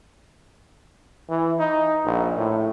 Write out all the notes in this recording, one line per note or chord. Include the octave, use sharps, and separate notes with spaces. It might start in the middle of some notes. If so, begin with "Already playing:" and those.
E3
D#4
A#1
A2